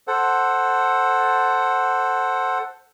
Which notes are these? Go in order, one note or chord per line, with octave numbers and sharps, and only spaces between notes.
A4 C5 F#5